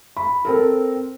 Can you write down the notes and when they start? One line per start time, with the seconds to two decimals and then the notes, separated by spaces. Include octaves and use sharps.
0.17 B5
0.45 C4 A4 A#4